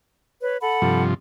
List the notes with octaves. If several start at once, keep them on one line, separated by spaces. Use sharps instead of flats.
B4 C#5
A4 F#5 B5
G2 C3 F3